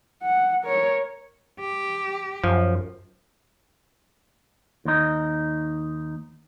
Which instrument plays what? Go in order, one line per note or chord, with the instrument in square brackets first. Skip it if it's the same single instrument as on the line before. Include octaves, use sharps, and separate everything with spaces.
[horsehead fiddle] F#5
A#4 C#5
[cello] G4
[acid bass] F#2 [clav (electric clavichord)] F3
[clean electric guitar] D#2 D#4